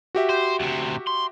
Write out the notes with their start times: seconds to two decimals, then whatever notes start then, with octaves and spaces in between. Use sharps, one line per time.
0.15 F#4 G4 E5
0.29 C5
0.60 D2 C3
1.07 C6